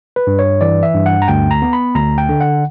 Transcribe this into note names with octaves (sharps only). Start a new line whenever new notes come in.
B4
G2
C#5
E3 D5
E5
G2
F#5
A#5
D2 G5
A#5
B3
B5
D2 A#5
G5
D3
F#5